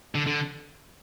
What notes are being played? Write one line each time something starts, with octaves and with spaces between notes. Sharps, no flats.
D3
D3